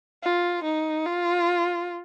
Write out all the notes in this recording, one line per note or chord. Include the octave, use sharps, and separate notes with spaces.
F4
D#4
F4